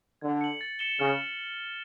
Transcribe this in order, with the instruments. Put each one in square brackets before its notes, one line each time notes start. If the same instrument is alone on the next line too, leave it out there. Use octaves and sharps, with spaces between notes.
[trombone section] D3 [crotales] G#6
[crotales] C#7 F#7
A6
C#7 E7 G7
[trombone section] C#3 [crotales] F6